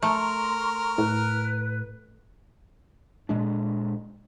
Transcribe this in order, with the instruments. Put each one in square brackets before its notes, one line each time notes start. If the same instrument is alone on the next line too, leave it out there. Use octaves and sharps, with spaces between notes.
[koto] A3 [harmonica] A#4 [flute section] A#5 C6 C#6
[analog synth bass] A2 [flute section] B4
[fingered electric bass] A#2 G#3 D4